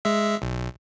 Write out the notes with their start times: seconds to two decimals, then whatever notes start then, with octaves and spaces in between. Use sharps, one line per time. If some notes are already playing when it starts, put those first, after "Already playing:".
0.05 G#3 E5
0.42 B1